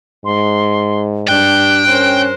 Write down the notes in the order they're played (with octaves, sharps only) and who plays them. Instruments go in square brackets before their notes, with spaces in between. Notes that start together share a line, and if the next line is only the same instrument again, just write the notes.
[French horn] G#2 [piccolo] C6
[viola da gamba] G2 D4 G4 [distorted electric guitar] G5 [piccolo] F#6
[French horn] C#4 [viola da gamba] A#4 C5